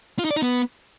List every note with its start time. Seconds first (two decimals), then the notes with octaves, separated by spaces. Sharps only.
0.19 F4
0.25 D#4
0.30 D5
0.36 D#4
0.42 B3